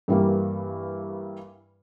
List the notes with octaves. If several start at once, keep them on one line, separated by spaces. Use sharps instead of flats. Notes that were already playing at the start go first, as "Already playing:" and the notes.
G2 E3 G3 A#3